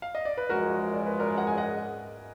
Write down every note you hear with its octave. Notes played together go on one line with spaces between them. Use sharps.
F5
D#5
D5
B4
F#2 F3 G#3 F#4 A#4
D5
B4
A#4 D5
F#5
G#5
D#5 F#5